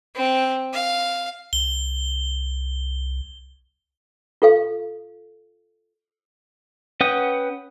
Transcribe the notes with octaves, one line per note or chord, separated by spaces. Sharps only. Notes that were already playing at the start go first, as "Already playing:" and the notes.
C4
F5
C2 G7
F4 A4 F5
C#4 B4 F#5 G5 D#6